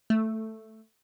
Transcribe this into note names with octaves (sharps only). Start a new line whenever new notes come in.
A3